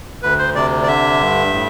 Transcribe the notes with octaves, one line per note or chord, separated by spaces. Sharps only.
D2 B4
C5
C3 D5
D5
D3 E5
G2
A2